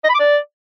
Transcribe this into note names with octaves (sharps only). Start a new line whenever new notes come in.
D#5
B5
D6
D5